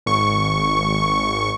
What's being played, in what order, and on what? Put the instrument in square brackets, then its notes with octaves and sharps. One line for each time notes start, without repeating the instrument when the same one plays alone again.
[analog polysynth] G#1 C#6